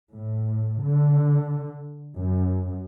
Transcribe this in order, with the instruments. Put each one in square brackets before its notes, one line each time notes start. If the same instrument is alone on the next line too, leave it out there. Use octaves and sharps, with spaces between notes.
[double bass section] A2
D3
F#2